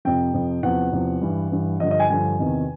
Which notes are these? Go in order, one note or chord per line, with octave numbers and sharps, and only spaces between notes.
F2 C3 F3 G5
F2 C3 F3
E2 C3 F3 F#5
E2 C3 F3
G2 E3
G2 E3
G2 D3 F3 D#5
D#5
G#5
G2 D3 F3 G#5
E2 C3 D#3